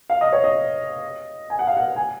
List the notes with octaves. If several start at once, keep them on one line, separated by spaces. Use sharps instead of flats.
F5
D#5
C#5
D#5
G#5
F#5
F5
F#5
G#5